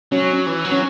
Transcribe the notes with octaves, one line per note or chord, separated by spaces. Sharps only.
F#3 C#4
E3
F#3
C#4